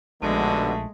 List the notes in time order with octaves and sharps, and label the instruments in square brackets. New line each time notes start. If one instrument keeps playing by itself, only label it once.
[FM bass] A#1 [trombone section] D#2 B2 D3 [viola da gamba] G#3 [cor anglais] A3